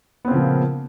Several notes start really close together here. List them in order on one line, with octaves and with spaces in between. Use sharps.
B3 C4 C#3 F3 A#2